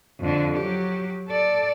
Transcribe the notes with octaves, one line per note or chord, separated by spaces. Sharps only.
F2 D3
F#3 G4
A4 D5